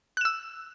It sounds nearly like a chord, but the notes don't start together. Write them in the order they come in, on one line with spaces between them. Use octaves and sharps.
F#6 E7 E6